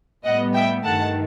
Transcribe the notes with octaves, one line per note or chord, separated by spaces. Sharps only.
A2 G3 B3 D#5 F#5
E5 G5
G2 D#3 A3 F#5 A5